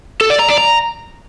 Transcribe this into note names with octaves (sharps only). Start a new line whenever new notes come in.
A4
D5
A#5
D5
A#5